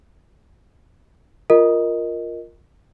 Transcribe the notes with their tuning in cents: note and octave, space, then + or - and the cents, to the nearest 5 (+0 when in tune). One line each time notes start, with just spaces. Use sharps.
F4 +0 A#4 +0 D#5 +0